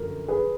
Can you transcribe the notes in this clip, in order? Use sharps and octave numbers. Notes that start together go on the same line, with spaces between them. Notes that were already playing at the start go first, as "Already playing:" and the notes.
Already playing: F#2 D3 F3 A#4
G#4 B4